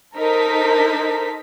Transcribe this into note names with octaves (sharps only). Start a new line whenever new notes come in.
D#4 A4 A#4 C5 B6